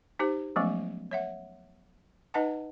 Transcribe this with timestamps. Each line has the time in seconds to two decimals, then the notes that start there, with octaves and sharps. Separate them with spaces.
0.19 D#4 G4 C5
0.56 F3 F#3 G#3 A3 B3 C#4
1.11 C#5 E5 F#5
2.34 D#4 B4 D#5 F#5 A5